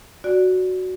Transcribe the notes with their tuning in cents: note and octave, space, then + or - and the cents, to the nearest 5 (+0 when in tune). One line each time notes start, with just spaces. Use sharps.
F#4 +0 D5 +0